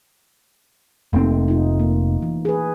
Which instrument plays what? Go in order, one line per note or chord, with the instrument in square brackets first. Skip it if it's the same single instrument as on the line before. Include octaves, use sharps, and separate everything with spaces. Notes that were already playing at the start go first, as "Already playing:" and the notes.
[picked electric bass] F1 C4 [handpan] A3 A#3 D#4
[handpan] D#4 F4
A#3
E3
G#4 B4